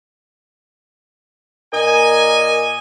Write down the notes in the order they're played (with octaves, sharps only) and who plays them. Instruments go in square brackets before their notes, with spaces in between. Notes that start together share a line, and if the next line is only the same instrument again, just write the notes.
[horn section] A#2 D#5 G#5 [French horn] A#4